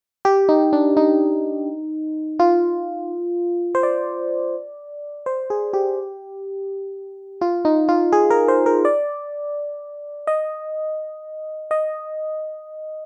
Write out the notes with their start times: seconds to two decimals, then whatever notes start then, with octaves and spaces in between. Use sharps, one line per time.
0.25 G4
0.49 D#4
0.73 D4
0.97 D#4
2.39 F4
3.75 C5
3.83 D5
5.26 C5
5.50 G#4
5.73 G4
7.41 F4
7.65 D#4
7.89 F4
8.12 G#4
8.30 A#4
8.48 C5
8.66 A#4
8.85 D5
10.27 D#5
11.71 D#5